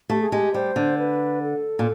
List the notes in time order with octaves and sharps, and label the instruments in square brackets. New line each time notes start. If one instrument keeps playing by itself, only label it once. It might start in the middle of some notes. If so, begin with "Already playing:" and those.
[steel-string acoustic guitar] A3 [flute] G4
[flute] G#4
[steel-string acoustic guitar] G#3 [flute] G4
[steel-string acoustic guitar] G3 [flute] C5
[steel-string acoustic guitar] D3
[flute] B4
A4
[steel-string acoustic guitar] A#2